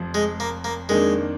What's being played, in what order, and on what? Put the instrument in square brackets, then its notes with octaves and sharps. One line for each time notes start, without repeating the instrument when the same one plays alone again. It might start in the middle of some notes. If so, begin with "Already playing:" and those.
Already playing: [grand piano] F1 F2 F3
[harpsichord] G#3
A#3
A#3
[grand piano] F2 D#3 A#3 D4 [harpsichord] G#3